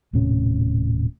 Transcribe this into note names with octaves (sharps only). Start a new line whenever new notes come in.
D#1 A2 C3 C#4